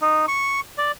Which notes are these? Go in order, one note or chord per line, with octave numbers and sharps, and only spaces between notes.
D#4
C#6
D5